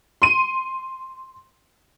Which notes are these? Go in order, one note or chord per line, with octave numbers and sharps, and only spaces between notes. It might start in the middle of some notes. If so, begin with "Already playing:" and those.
C6 D#7